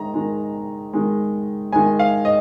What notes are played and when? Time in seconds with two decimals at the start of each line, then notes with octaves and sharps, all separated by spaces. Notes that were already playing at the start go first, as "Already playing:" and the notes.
Already playing: D#3 G#3 A#5
0.14 D#3 G#3
0.93 D#3 G#3
1.72 D#3 G#3 G#5
1.99 F5
2.25 D#5